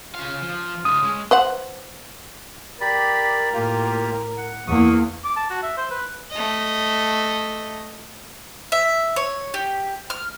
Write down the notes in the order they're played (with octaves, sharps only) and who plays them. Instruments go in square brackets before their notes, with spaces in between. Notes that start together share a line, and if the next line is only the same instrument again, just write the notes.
[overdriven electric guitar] C#3 F5 [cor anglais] F4
[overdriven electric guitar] F3
[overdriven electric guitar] C#3 F3 [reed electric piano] D#6
[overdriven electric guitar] G#3 [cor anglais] C#4
[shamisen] B4 C5 F#5
[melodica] G4 D5 B5 [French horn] A#4
[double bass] A2 [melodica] A#3 F4 G4
[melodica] F#5
[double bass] E2 A#3 [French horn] B3 [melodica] C#6 D#6
[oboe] D6
A5
F#4
E5
C5
B4
[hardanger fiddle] A3 D#5
[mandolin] E5
C#5
G4
F6